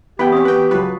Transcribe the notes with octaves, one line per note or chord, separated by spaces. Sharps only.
E2 B3 E4 G4 B4 F#5 G5 B6
C4 C#4 C#6 D#6
E2 F#4 B4 G5
C#2 F#3 F4 F#4 B4